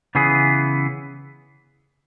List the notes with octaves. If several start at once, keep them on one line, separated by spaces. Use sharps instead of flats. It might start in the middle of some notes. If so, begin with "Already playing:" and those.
C#3 E3 B3 G#4